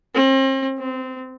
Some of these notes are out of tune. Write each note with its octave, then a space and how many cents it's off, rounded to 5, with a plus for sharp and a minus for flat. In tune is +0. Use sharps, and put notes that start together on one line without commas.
C4 +40
C4 -20